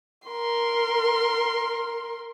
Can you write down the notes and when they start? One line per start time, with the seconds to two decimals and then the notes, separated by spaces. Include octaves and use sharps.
0.27 A#4 C6